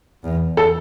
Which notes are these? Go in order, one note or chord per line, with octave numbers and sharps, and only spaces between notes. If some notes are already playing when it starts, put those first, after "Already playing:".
E2
A4